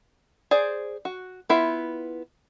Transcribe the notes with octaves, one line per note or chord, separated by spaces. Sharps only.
G#4 C5 D5
F#4
B3 E4 F4 E5